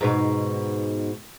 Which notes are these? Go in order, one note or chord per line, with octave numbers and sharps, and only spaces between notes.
G#2 B2 D#4